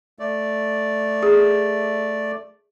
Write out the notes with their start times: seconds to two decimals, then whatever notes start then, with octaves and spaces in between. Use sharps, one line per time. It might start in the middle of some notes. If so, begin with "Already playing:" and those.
0.19 A3 D5
1.23 G#4